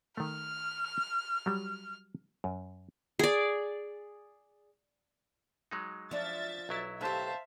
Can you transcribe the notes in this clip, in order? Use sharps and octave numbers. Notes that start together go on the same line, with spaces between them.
D#3 A3 F6
F#3 G3
F#2
G#4 D5
F#3 G#3 D#4
F3 D4 E5 A6
B1 F#3 E4
A3 G4 C5 E5 F5 A5